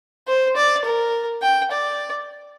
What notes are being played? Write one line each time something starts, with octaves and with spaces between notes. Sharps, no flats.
C5
D5
A#4
G5
D5